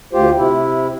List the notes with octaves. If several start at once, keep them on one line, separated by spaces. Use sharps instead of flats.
D2 F4 G4 C5
C3 E4